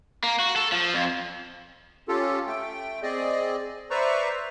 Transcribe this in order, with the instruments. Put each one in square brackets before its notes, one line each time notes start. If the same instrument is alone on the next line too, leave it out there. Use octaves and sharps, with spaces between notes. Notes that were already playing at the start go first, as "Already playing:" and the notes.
[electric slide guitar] A#3
F#4
A4
F3
F2
[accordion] C#4 F4 G4 A4
A3 G5
C4 G#4 D5 D#5
B4 C5 D5 E5 A#5 C#6